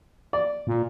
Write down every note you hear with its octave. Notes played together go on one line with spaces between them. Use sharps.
D5
A#2